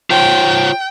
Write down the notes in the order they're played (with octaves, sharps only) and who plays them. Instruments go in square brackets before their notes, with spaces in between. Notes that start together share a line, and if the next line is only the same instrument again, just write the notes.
[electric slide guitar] F4 C5 C#5 [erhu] G5